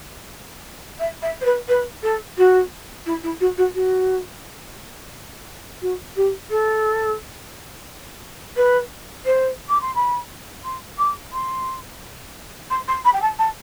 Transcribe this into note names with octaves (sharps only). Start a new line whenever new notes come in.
E5
E5
C5
B4
B4
A4
F#4
E4
E4
F#4
F#4
F#4
F#4
G4
A4
B4
C5
D6
C6
B5
C6
D6
C6
C6
C6
B5
G5
A5
A5